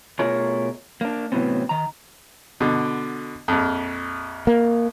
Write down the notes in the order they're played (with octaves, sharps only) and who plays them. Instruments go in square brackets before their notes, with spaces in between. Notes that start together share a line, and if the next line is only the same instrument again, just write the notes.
[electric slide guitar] B2 A3 F4 G#4 A#4 C#5
A#3 D4
A2 C3 E3 F#3 B3 C4
D#3 A#5
[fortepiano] B2 D3
A#1 F2
[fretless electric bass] A#3